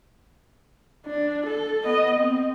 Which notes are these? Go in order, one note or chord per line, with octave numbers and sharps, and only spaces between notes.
D4
A4
B3 D#5
C4